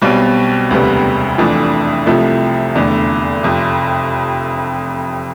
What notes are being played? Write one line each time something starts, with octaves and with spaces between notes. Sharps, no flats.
B1 B2 G3 C4
E1 D2 C3 G3 B3
F1 F2 E3 A3 D4
C2 C3 F3 A3 E4
F1 E2 D3 A3
F1 F2 C3